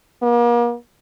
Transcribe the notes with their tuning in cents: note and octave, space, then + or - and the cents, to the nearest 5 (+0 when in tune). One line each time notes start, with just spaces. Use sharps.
A#3 +40